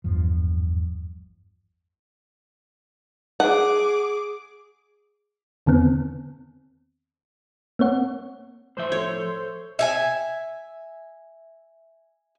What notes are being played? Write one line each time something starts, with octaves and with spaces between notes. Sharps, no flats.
G#1 E2 G2 F3
G#4 F#5 D6
E2 D3 D#3 B3 C4
A#3 C4 C#5 F#5
A2 F3 C5 E5 G6
A4 C#5
E5 F5 G#5